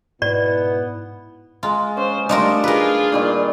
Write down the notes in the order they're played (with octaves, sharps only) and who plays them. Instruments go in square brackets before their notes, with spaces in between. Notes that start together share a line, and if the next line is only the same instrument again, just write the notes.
[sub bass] G#2 [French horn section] B2 E4 [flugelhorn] B3 [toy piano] D5
[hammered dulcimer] G#3 A#5 [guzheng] F4
[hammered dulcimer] C#4 [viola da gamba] C5
[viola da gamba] G3 A3 [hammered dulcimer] D4 [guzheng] D#4 F4 A#4
[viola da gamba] F4 G#4 [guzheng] A#4 B4
[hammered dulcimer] A#2 D#3 G3